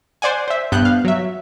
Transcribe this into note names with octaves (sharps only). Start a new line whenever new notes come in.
C5 D5 F#5 G#5
C5 E5
G2 B3 F#6 G6
F5
F#3 E5